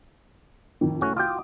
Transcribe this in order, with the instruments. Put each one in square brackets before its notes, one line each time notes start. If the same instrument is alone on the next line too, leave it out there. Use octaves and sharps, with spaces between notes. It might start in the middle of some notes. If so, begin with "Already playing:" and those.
[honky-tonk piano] F2 A2 D#3
[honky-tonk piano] C2 A3 [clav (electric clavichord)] C#4 F#4
[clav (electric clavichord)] F4 G5 [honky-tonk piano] F#4 D6 D#6